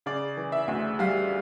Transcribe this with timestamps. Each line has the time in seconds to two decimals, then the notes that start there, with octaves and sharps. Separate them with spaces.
0.06 C#3 D5
0.37 E3
0.52 E5
0.68 D2
0.99 G3 F5